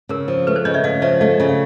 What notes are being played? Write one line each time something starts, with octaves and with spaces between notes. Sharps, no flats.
C#3 A#4
F3
A3 B4
C5
C#3 C#5 D#5
D5 E5
C#3 D#5 F5
F3 D5 E5
A3 D#5 F5
C#3
F5